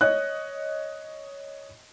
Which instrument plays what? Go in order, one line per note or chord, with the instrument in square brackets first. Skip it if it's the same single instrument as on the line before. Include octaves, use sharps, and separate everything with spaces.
[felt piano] C#5 D#5 F#6